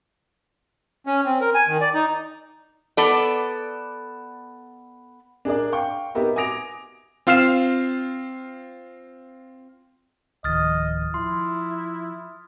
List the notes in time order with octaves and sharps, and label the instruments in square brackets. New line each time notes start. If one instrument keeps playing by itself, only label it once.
[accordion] C#4
C4
A#4
G#5
D#3
D5
D#4
[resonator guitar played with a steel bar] B3 A4 D5
[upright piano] D4 G#4 A#4 D5
F5 G5 C#6
B3 D#4 G4 A#4 E5
G#5 D6 D#6 A#6 D7 F7
[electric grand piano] C4 F4 F5 F6 C7 E7
[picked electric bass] D1 D#3 F3 [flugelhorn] D#5 [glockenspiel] D#6 F6 A6
[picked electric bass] F3 [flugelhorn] E4 [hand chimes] C6